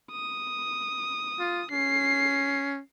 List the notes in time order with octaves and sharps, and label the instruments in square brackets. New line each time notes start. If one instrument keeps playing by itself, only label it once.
[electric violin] D#6
[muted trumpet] F4
[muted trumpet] C#4 [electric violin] C7